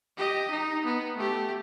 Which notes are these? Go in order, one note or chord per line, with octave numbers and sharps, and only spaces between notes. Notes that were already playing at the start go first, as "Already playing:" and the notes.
G4 D#5
D#4
B3
A3 G4